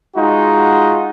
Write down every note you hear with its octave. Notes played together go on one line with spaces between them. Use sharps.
G#3 D#4 F4 F#4